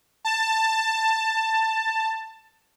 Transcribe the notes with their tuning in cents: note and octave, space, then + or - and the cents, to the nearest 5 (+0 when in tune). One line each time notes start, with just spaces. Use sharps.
A5 +15